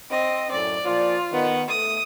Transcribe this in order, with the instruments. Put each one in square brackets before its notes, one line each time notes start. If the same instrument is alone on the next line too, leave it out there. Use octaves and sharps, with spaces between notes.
[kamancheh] C4 D#5
[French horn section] F#2 A2 [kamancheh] D5
[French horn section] A#2 F3 D5 [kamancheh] F4
[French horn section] D#3 B3
[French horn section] A3 [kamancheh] D#6